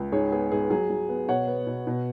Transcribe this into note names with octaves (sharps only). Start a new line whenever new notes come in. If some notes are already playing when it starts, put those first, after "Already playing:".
Already playing: C#2
G#2 G#4 C#5
B3 G#4
G#2 G#4
F#3 G#4
F#3
B3
B2 C#5 F#5
B3
B2
B2